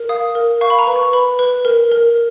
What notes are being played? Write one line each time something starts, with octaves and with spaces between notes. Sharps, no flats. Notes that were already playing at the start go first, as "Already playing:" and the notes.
Already playing: A#4
F5 D#6
A#4
F5 C#6
B5
A#5
B4
C#6
B4 B5
B4
A#4
A#4